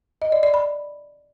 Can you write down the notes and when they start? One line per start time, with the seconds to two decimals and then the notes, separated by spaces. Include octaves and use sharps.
0.22 D#5
0.32 D5
0.43 D5
0.54 B5